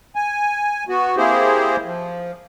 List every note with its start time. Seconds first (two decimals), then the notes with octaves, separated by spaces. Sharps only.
0.16 G#5
0.89 B3 F#4
1.17 A#3 C4 E4 G4 G#4 C5
1.85 F3